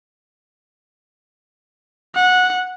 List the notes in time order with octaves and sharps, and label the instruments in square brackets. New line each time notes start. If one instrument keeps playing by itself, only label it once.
[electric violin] F#5